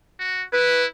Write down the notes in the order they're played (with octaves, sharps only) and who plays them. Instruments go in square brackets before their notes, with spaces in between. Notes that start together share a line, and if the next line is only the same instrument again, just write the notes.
[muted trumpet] F#4
[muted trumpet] E4 [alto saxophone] B4